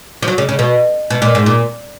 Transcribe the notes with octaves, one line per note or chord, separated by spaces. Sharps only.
F3
F#3
C#3
C#3
B2
B2
A#2
G#2
A#2